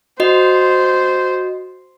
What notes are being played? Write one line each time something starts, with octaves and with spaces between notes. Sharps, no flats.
F#4 C5 D#5